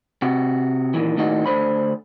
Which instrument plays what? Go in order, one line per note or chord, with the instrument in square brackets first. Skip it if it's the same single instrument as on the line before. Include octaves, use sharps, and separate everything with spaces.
[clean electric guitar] C3 F#4
A#2 D#3 E3
D#2 A2 D#3 D#4 F#4
D2 D3 C5 B5